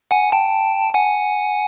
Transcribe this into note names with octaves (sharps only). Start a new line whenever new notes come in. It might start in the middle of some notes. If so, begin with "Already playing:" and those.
F#5 G#5
G5 A5
F#5 G#5